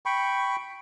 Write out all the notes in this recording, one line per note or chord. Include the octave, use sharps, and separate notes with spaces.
G5 B5 C#6